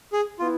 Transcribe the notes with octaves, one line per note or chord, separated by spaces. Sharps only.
G#4
E3 B3 E4 F4